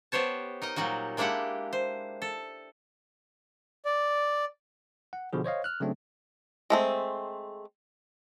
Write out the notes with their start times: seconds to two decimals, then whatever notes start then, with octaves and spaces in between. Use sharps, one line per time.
0.12 B3 G4 C5 C#5 A5
0.62 D#4 A#4 D#5
0.76 A#2 F#3 G3 D#4 F#4
1.17 G#3 A#3 D4 E4 G4 F#5
1.73 C5
2.22 A4
3.85 D5
5.13 F#5
5.33 B2 D3 F3 G#4
5.44 C5 C#5 D#5 F5
5.64 F6 F#6
5.80 C#3 F#3 A3 C4 D4
6.70 G#3 A3 C4